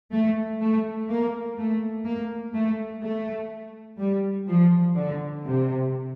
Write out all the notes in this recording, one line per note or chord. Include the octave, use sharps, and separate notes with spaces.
A3
A3
A#3
A3
A#3
A3
A3
G3
F3
D3
C3